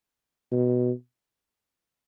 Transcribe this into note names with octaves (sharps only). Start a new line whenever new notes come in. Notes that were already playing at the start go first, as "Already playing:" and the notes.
B2